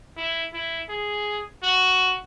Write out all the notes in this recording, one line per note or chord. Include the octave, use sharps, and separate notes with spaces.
E4
E4
G#4
F#4